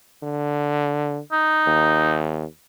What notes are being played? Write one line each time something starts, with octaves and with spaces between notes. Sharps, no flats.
D3
D#4
D#2